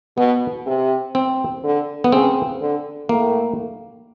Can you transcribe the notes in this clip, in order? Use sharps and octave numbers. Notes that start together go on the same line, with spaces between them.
B2 B3
C3
C4
D3
B3
C#3 C4
D3
A2 A#3